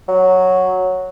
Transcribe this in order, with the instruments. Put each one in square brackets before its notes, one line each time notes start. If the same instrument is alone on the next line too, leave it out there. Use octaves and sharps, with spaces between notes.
[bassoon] F#3